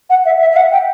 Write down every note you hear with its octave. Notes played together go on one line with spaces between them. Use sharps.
F#5
E5
E5
E5
F#5
G5